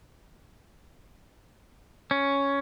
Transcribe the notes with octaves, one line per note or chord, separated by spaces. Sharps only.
C#4